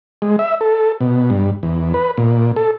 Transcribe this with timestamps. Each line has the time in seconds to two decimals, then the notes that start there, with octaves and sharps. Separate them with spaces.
0.22 G#3
0.39 E5
0.61 A4
1.01 B2
1.30 G2
1.63 E2
1.94 B4
2.17 A#2
2.56 A4